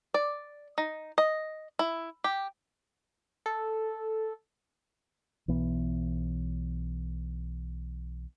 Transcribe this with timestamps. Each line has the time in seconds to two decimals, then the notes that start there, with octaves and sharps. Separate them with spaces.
0.14 D5
0.78 D#4
1.18 D#5
1.79 E4
2.24 G4
3.46 A4
5.48 B1 E3 B3